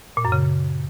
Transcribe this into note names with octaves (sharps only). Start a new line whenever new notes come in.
A#2
F#2
C#3